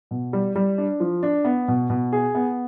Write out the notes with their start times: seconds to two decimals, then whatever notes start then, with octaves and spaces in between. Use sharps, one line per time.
0.11 B2
0.33 G3
0.56 G3
0.78 D4
1.00 F3
1.23 D4
1.45 B3
1.68 B2
1.90 B2
2.13 G#4
2.35 B3